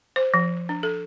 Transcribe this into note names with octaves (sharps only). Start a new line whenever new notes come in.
C5
F3
D4
A4